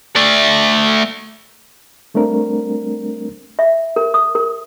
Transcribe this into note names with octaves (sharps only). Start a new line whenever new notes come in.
A3 D5
G3 A3 C4 D4 A#4
E5
A#4
D#6
A#4